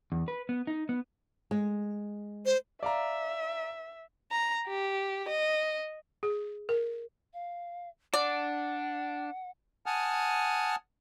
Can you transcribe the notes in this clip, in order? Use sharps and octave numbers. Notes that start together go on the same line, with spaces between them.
E2
B4
B3
D#4
B3
G#3
C5
D5 E5 F5 A#5
A#5
G4
D#5
G#4
A#4
F5
D4 D5 F#5
F#5 G#5 A5 D#6 F6